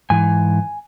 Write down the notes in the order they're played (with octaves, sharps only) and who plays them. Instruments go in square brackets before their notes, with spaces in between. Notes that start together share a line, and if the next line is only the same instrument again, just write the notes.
[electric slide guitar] G#2 E3 G#5